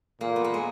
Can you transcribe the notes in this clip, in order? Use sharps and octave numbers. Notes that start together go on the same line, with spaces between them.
A#2 A#3
B3
A#3
G#3